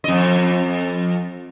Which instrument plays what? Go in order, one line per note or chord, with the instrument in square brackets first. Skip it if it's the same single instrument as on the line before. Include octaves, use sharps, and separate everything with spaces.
[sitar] F2 D#5